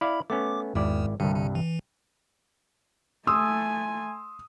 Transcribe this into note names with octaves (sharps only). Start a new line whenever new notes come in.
E4 D5 F5 B5
A3 B3 C#4 D6
G#1 E2 E4 D5
C2 G2 D3
D3
E3
A3 G#5 C6 D#6 E6